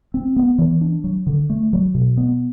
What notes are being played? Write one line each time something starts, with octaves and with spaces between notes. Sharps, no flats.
C4
B3
E3
D4
F#3
D3
A3
F#3
B2
B3